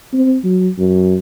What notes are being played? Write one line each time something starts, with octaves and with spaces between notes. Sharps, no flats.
C4
F#3
F#2